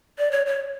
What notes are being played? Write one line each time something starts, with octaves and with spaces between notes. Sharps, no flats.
D5
C#5
C#5